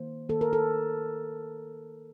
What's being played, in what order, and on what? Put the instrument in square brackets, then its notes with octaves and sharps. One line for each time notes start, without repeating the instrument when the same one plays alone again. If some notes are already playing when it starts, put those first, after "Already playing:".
Already playing: [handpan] D#3 A#3 C5
D#3 A#3 A4
A#4
A4